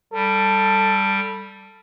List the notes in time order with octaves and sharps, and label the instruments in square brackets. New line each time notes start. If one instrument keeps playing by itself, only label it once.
[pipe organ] G3 [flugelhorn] A4